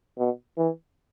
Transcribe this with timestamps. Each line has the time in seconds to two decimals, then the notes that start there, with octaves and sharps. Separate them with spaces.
0.18 B2
0.57 E3